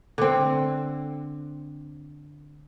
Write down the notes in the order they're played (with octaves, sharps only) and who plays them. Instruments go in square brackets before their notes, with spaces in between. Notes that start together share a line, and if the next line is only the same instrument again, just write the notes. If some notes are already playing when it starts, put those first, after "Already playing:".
[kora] D3 C4